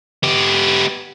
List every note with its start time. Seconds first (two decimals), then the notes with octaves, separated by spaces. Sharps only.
0.23 B3 G4